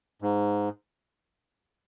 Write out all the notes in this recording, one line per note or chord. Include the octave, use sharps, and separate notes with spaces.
G#2